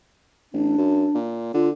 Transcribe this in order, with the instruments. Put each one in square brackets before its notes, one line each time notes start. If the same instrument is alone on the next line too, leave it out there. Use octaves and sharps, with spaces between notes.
[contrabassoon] A1 [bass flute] D4
[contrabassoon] F#2
A#2
[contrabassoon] D3 [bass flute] F4